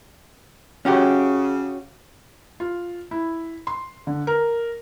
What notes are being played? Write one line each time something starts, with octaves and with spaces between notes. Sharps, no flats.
C#3 C#4 F#4 G4
F4
E4
C6
D3
A#4